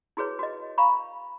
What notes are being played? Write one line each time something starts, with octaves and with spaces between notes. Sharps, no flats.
E4 F#4 G#4 B4 C#5
F#4 D#5
F5 A#5 B5 C#6